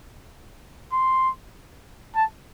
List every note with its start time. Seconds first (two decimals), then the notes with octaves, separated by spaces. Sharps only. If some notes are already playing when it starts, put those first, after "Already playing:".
0.93 C6
2.15 A5